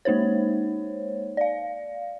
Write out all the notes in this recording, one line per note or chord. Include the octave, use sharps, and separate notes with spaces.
G#3 A#3 D#4 C5 C#5
D5 F5